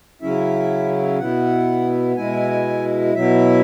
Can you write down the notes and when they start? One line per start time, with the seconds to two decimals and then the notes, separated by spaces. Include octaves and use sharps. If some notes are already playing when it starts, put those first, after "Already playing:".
0.22 C#3 F#3 C#4 E4 E5
1.19 B2 B3 E4 F#5
2.17 B2 G#3 E4 G#5
3.15 B2 F#3 E4 E5